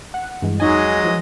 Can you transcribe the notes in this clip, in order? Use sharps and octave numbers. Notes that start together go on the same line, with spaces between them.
F#5
G2 E3 G#3
F2 F#3 G#3 D#4 D#5 G#5
E3 F3